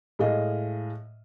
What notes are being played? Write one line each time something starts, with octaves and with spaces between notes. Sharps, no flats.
A2 G#3 D#5 F5